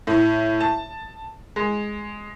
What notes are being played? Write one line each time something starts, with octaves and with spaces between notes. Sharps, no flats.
A2
A5
G#3